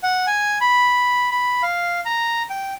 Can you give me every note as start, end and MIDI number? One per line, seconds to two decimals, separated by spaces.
0.03 0.26 78
0.27 0.58 80
0.61 1.29 83
1.31 1.62 83
1.63 2.00 77
2.05 2.43 82
2.50 2.74 79